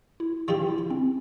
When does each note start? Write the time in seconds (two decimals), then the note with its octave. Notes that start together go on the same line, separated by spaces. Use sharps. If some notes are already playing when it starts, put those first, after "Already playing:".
0.20 E4
0.48 G2 F3 C4 F4 G4
0.69 E4
0.90 C4